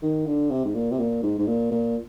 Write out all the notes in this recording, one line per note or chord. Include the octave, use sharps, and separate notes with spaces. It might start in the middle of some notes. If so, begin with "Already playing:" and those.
D#3
D3
C3
G#2
A#2
C3
A#2
G#2
G#2
A#2
A#2